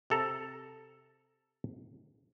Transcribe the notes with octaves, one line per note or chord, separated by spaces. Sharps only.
C3 A4 A#5